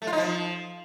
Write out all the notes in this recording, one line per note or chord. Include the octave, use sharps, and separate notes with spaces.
A3
F4
D#4
F3